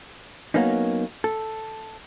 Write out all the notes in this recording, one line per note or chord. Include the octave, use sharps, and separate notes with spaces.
F#3 A#3 B3 C#4 D#4
A4